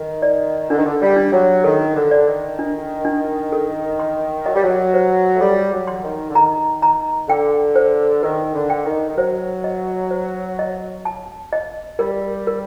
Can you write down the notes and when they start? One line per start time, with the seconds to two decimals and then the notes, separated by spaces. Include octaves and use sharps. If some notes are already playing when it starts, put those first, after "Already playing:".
Already playing: D#3 D#4
0.22 D5
0.70 D3 D4
0.77 D#3
0.85 D3
1.02 G3
1.16 D4
1.32 F#3
1.64 D#3 A4
1.95 D3
2.11 D5
2.27 D#3
2.59 D4
3.05 D4
3.52 A4
3.99 C6
4.46 F#3 D#5
4.55 G3
4.63 F#3
4.94 C5
5.35 A3
5.41 G3 A4
5.72 F#3
5.87 C6
6.03 D#3
6.30 D3
6.35 D#3 A#5
6.82 A#5
7.28 D3 G5
7.76 C5
8.23 D#3 A#4
8.54 D3
8.70 G5
8.85 D#3
9.10 D#3
9.17 F#3 C5
9.64 D#5
10.11 C5
10.59 D#5
11.05 A5
11.53 D#5
11.99 G3 A#4
12.47 A#4